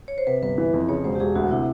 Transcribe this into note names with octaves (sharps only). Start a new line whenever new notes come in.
C#5
C5
C3 B4
G1 B4
E3
F2
C#3 C#5
E1 C5
G4
E1 G#4
D2 F#4
C3 E4